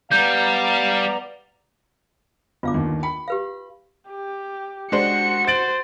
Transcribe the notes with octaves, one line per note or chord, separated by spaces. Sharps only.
G3 B3 D5 F5 A#5 G6
G1 F4 F5 D6
G1 D#2
G5 B5
G4 B4 F5
G4
G#3 D4 F#4 C5 C#7
C5 A6 D7 F#7